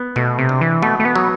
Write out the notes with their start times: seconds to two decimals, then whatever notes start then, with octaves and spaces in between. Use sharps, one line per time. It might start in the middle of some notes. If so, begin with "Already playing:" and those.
Already playing: B3
0.16 B2 A3
0.39 C3
0.49 D4
0.61 E3
0.82 B2 A3
1.00 A3
1.05 B3
1.15 F#3